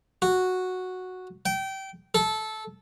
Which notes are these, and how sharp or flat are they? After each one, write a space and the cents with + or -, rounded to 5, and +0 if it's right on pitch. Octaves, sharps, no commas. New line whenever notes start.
F#4 -5
G5 -25
A4 -15